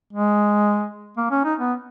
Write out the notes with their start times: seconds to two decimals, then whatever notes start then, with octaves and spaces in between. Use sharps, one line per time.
0.13 G#3
1.17 A#3
1.31 C#4
1.44 D#4
1.59 B3